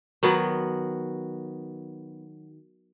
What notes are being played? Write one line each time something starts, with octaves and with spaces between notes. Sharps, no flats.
D#3 F#3 B3